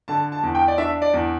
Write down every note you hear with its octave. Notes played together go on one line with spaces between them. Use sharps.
D3 A5
A5
E2
G5
D5
D4 E5
D5
E2